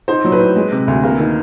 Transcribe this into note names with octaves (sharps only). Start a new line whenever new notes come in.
D#4 C5
F#3
B4
A2
G#3
C3
D2
A#3
D#3